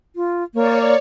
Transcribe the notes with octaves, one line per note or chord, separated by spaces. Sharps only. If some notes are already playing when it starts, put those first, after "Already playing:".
F4
A#3 C#5 D5